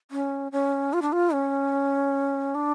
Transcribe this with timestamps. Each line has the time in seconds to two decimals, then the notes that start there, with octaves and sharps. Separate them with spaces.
0.11 C#4
0.52 C#4
0.93 F4
1.02 D4
1.12 F4
1.33 C#4
2.55 D4